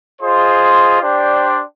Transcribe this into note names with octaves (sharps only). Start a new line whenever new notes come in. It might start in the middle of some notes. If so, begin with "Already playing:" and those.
F4 G#4 C5 D#5 C6
D4 G4 C5 D5 G5 C6